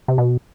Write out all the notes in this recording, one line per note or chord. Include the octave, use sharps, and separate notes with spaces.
C3
B2